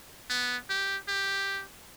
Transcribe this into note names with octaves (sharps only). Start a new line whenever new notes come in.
B3
G4
G4